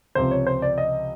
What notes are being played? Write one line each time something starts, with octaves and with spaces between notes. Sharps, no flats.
C#2 C3 F3 C5
C#5
C5
D5
D#5